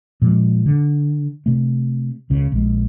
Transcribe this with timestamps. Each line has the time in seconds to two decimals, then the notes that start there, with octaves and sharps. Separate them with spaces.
0.22 A#2 F3 G3 G#3
0.66 D3
1.46 C3 A3
2.30 C#2 C#3
2.52 A#1 G#3